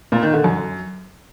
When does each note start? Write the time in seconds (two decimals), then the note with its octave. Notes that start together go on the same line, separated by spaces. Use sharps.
0.12 A#2
0.23 D#3
0.34 D3
0.44 F#2